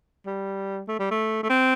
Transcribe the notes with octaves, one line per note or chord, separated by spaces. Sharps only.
G3
A3
G3
A3
A3
C4